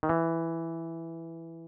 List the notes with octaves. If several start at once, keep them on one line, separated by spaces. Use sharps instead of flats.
D#3
E3